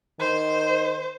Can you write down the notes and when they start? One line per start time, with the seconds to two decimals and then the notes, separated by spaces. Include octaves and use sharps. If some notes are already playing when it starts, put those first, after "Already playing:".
0.20 D#3 C5